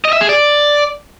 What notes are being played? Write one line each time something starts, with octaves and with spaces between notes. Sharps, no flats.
D#5
E5
G#4
D5